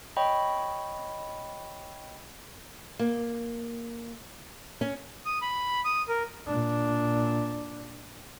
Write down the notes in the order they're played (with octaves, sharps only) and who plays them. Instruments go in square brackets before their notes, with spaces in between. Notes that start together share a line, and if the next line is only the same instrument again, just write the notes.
[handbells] C#5 D#5 G5 B5 C#6
[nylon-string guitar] A#3
C#4
[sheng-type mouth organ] D#6
B5
D#6
A#4
[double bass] A#2 D4